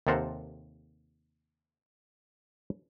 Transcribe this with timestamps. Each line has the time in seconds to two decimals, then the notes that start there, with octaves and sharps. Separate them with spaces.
0.07 D#2 C3 A4 A#4 C5 F#5